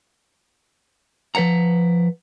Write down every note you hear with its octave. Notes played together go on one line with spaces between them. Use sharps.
F3 B4 C#5 F#5 A#5